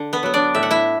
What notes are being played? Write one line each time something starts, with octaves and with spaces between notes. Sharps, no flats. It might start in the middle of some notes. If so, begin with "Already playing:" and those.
Already playing: D3
B3 B4
F#3 B3
D4 D5
A2 E5
F#5
E4 E5